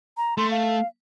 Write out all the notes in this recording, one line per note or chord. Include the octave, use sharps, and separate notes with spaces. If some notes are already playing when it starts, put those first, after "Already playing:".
A#5
A3 C6
F5